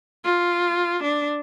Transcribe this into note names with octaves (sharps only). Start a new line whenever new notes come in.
F4
D4